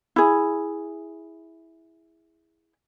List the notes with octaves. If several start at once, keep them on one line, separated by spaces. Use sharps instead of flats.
E4 G#4